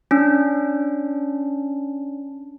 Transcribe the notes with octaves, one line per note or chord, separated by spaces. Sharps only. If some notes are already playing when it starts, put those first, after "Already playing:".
C#4 D4